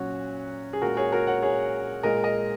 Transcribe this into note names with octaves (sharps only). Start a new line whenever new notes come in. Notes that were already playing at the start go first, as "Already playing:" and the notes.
Already playing: A#2 F#3 C#4 F#4
G#4
A#2 G#3 F#4 A#4
G#4 C#5
F#4 A#4
C#5 F#5
G#4 C#5
A#2 G#3 A#4 D#5
A#4 D#5